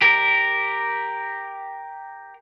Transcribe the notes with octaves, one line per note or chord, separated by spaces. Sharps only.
G4 A#4